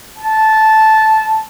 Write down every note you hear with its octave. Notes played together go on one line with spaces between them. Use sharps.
A5